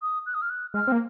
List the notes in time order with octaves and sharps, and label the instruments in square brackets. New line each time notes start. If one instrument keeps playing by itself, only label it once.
[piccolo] D#6
F#6
D#6
F6
F#6
[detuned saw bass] G#3 [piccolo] F6
[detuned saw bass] C4
A#3